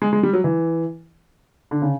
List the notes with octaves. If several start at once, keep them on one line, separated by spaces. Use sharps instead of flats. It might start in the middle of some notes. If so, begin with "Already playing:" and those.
G#3
G#3
G3
F#3
E3
D3
C#3